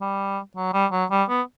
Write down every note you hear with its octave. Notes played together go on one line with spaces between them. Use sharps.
G3
F#3
G3
F#3
G3
B3